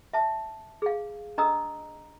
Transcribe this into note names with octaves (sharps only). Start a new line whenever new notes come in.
E5 A5
G#4 F5
D4 D#5 A#5 D#6 E6